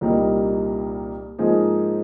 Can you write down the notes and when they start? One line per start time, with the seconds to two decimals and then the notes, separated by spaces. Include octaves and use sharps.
0.01 C2 A#2 G3 A#3 D#4
1.39 G#2 F3 A#3 D#4 G#4